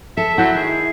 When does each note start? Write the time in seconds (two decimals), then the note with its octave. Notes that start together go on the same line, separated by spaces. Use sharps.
0.17 A4 E5
0.38 F#3 E4 F#5 G6
0.55 D#3 G#4